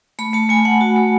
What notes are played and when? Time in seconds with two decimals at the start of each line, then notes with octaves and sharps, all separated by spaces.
0.19 A3 B5
0.33 A3 A5
0.49 A3 G#5
0.65 A3 F#5
0.81 F#4
0.96 A3